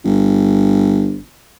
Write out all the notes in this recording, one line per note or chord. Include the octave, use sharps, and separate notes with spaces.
G1